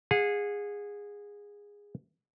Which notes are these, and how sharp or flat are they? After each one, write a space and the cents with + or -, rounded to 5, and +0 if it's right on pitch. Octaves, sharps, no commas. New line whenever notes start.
G#4 -15 F#5 -45